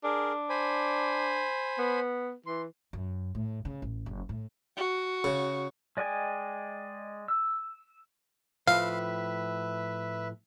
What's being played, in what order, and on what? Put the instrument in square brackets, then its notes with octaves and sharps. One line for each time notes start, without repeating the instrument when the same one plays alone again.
[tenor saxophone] D4 [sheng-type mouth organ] G#4 A#4
[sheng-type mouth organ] C5 G#5 B5
[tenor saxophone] B3
[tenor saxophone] E3 [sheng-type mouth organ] C6
[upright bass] F#2
A2
C#3
A1
F#1
A2
[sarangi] F#4
[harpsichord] C#3
[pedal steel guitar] G#3 D5 D#5 G5 G#5
E6
[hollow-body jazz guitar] A2 F3 [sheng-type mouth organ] B4 E5 [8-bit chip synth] F5